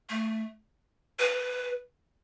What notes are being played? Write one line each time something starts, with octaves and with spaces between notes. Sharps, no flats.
A3
B4